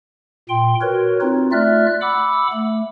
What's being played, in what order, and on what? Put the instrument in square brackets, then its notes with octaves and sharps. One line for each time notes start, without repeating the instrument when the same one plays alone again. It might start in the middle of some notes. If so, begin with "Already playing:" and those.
[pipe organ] A#2 G5 C6
F#4 A#4 B4 C#5
C4 D#4 F4
A3 F4 D5 E5 F6 F#6
F#5 B5 D6 E6
A3